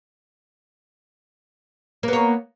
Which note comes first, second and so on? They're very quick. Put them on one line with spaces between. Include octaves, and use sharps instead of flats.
A#3 B3 C#5